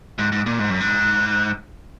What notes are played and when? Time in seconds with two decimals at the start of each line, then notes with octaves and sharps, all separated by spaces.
0.19 G#2
0.32 G#2
0.46 A#2
0.59 G#2
0.70 F#2
0.81 G#2